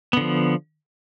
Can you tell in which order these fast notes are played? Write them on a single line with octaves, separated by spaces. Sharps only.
B3 D3 F3